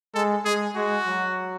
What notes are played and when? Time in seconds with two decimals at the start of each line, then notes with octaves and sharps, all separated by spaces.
0.14 G#3 A4
0.45 G#3 G#4
0.75 G#3 F#4
1.06 F#3